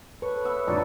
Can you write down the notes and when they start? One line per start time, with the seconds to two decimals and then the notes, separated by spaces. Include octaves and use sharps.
0.22 A4 B4 C#5
0.44 B3 E5 C#6
0.68 F2 G#2 D3 F#4 A4 B4 D5